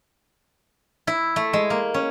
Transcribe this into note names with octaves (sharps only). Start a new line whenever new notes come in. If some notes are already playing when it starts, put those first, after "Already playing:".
E4
A3
G#3
A#3
C#4